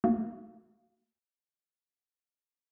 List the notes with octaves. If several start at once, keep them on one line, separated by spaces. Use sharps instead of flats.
A3 A#3 D#4 F#4 F5